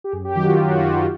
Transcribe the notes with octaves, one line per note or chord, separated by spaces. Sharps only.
G4
F#2 G#4
G4
D#3 F#3 F#4
F4
F#2 F4
F#4
D#3 F#3 F4
F4